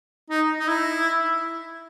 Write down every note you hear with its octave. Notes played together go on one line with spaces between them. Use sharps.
D#4
D#4
E4